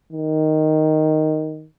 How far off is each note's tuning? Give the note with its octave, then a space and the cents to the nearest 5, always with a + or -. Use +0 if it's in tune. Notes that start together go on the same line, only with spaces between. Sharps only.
D#3 +0